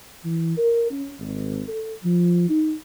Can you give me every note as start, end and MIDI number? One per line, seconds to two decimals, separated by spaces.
0.24 0.56 52
0.57 0.90 70
0.91 1.12 61
1.19 1.62 32
1.68 1.91 69
2.04 2.49 53
2.49 2.72 63